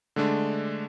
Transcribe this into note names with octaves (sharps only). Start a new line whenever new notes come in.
D3 G#3 A3 D4